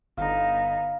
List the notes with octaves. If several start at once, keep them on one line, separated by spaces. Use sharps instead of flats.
G1 D3 B3 D#4 F5